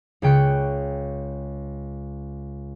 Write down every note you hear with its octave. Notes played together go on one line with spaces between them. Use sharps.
C#2 C#3 G5 F#6 C#7